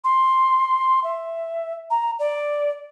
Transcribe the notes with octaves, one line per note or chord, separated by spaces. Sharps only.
C6
E5
A#5
D5